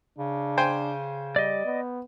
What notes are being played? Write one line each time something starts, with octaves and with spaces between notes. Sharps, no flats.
C#3 D4
C5 G5 G#5
G3 D5 D#5
B3